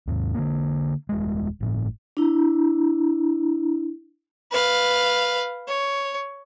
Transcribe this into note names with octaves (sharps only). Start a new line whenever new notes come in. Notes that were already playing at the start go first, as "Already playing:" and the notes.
D#2 G#2
D3 A#3
D#1 G#3
G1 A2
D4 E4
B4 F5
C#5